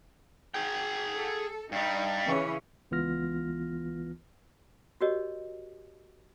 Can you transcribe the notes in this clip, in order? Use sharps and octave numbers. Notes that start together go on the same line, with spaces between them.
G#4 G5
A4
G2 G3 D#4
C#3 E3 C#4
C#2 E3 B3 F4 F6 A#6
F#4 G4 A#4 C#5 D#5